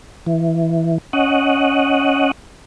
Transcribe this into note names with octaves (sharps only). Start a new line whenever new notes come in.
E3
C#4 D#5 F#5